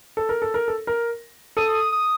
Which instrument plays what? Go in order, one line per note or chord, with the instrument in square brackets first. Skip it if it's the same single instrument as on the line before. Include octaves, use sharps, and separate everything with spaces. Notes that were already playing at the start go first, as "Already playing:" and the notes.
[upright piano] A4
A#4
A4
A#4
A4
A#4
[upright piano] A4 [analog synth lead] D#6
[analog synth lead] D#6